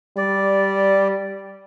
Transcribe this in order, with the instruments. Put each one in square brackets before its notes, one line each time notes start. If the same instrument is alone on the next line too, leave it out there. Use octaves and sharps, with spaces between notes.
[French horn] G3 [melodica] D5